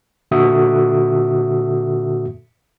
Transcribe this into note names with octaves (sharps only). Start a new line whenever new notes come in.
A#2 D3 F#4 A4 E5 D#6